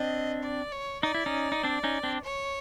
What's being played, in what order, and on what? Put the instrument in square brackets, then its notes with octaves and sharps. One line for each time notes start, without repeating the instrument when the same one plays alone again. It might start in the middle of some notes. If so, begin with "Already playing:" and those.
Already playing: [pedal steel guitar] C4 D4 [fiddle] D#5
[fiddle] D5
C#5
[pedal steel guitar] D#4 [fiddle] D5
[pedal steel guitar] E4
C#4 D#4
D#4
C4 D4
C#4 D#4
C4 D4
[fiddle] C#5